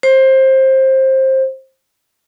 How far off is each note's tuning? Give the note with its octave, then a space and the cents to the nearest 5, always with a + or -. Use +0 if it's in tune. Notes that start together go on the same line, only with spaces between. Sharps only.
C5 +20